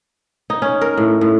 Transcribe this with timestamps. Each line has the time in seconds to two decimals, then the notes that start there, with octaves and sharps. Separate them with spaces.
0.50 D#4
0.62 C#4
0.81 A#4
0.97 A2
1.21 A2